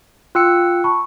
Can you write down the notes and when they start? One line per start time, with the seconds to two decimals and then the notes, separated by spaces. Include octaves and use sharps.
0.35 F4 G5 E6 F#6 C#7
0.84 A5 B5 C#6